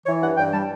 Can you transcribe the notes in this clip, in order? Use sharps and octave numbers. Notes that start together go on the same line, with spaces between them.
E3 C#5
G2 F#5
G2 G5
G3 A5